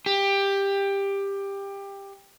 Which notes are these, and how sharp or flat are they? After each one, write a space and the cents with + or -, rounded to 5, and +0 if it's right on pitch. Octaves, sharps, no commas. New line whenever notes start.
G4 +15